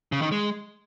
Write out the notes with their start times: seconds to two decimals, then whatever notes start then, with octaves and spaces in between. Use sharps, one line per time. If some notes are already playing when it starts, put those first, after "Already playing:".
0.12 C#3
0.22 D#3
0.32 G#3